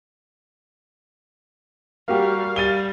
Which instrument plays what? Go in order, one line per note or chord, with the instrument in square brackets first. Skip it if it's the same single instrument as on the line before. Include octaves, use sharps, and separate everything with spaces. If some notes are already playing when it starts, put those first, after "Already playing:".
[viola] G3 [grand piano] A#3 F#4 G4 [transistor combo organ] F5
[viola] G3 [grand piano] A6 D#7 G7